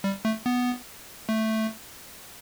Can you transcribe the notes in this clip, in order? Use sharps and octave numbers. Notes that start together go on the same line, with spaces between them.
G3
A3
B3
A3